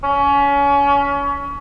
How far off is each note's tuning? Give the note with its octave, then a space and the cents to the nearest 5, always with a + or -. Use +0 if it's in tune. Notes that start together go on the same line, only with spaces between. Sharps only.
C#4 +25